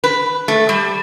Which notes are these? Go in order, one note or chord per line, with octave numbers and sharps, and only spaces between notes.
B4
A3
G3